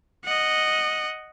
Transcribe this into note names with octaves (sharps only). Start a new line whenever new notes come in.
D#5 F#5